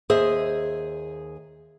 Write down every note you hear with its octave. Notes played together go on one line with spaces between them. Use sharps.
D#2 G#4 C5 D#5 E5